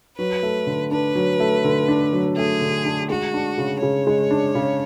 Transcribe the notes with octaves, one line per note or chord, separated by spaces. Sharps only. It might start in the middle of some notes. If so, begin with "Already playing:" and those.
F#3 B4
A3
D3
D4 B4
F#3
A3
D3
D4
F#3
A3 G#4
D3
D4
G#3 F#4
D4
C#3
C#3 C#5
G#3
D4
C#3